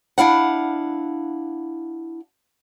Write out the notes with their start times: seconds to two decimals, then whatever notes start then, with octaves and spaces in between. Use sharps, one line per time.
0.18 D4 E4 F5 F#5